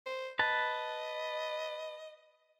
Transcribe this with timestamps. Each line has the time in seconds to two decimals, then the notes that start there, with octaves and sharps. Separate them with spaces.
0.06 C5
0.39 B4 D#5 A5